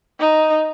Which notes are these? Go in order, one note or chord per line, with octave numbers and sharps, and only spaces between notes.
D#4